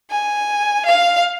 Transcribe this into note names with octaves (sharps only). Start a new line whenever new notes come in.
G#5
F5